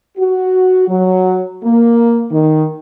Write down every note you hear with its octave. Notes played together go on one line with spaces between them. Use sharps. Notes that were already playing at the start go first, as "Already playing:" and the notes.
F#4
F#3
A#3
D#3